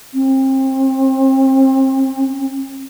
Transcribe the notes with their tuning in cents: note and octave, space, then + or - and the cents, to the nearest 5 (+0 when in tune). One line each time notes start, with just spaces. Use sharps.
C4 +30